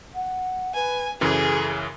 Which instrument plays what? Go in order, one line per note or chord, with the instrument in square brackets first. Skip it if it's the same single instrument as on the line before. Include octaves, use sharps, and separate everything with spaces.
[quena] F#5
[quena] B4 [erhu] G#5
[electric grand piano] F#2 C#3 E3 [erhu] G#4 [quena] A4